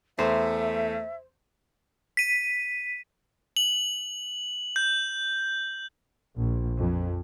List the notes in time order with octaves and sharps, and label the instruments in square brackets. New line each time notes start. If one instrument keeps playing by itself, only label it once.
[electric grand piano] E2 [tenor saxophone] A3 [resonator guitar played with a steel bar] C5 [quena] E5
[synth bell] B6 D#7
[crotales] F#7
G6
[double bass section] A#1
F2